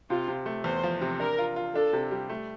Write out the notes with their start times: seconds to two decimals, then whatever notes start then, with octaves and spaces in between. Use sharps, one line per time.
0.09 C3 F4
0.28 C3
0.46 A3
0.64 E2 C5
0.83 F3
1.01 C3
1.20 D4 A#4
1.38 F4
1.56 F4
1.75 D4 A4
1.93 C3
2.11 G3
2.29 A3